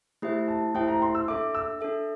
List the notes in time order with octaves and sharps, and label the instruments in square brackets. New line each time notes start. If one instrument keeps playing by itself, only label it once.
[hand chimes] A3 E4 G4 C5 E5
[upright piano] A5
[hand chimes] A3 E4 G4 C5 E5 [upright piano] G5
[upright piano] A#5
C6
E6
[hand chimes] D4 A4 E5 [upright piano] D6
[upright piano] E6
[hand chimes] D4 A4 E5